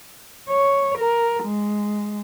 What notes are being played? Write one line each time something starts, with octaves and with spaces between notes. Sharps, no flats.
C#5
A#4
G#3